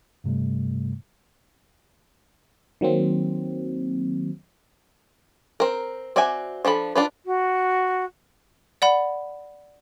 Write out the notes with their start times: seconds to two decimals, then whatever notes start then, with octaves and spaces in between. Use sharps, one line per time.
0.24 G2 C3 G3 A3
2.81 D#3 F#3 A#3 C4
5.60 C4 A#4
6.16 C4 F#4 D5 E5 G#5
6.65 F3 D4 A4 B5
6.95 D4 F4 B4
7.25 F#4
8.82 D5 F#5 B5